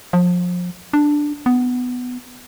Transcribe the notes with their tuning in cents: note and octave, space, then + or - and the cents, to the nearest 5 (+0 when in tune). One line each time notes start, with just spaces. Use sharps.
F3 +30
D4 +5
B3 +10